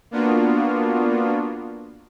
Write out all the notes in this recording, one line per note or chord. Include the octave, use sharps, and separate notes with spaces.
A#3 B3 D4 F4 F#4